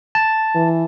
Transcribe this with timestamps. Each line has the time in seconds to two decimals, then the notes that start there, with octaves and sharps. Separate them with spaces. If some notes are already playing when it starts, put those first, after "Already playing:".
0.15 A5
0.55 E3